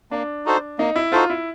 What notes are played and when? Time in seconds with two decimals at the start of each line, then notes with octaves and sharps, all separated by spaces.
0.11 A#3 D4
0.45 D#4 F#4 A4 C5
0.78 A#3 D#4
0.96 E4
1.12 D#4 F4 F#4 A4 C5
1.30 E4